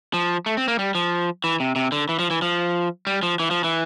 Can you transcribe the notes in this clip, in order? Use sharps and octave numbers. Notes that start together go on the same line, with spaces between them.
F3
A3
C4
A#3
G3
F3
E3
C3
C3
D3
E3
F3
E3
F3
G3
F3
E3
F3
E3